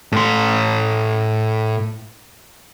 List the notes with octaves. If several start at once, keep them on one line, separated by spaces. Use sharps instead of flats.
A2 C6